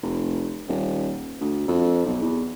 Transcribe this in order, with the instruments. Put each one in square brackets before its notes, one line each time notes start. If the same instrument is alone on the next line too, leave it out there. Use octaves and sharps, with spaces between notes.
[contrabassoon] F1
D#1
D2
F2
B1
E2